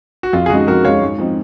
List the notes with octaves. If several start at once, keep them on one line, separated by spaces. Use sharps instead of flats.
F#4
F2 F4
G#4
C#3 G#3 D#4 F#4
F2 F#4 A#4
C#3 G#3 D#4 C#5 F5
G#2
F3 C4 D#4